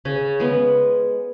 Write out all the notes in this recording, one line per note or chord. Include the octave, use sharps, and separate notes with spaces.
C#3 C#4
G#3 B3